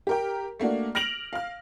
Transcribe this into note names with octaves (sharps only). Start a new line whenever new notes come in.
G4 A#4 G5
A3 A#3 D4 F#4
F6 A#6 D7 F7 F#7
F5 F6